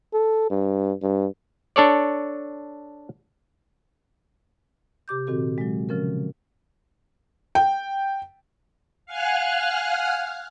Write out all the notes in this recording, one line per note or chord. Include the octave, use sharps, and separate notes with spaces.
A4
G2
G2
D4 A4 C#5 D5
C3 G4 D6 G6
A#2 D#3 C4 F#4 A4
F#3 G#3
C#3 F3 C#4 A#4
G5
F5 F#5 G#5 F6 F#6